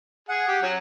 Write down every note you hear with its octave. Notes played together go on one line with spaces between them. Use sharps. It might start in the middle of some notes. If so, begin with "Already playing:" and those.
G#4 F#5
G4
F#3 C#4